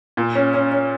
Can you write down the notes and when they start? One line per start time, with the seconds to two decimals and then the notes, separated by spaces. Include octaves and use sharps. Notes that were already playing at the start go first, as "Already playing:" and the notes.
0.17 A#2
0.35 C#4
0.54 C#4
0.72 C#4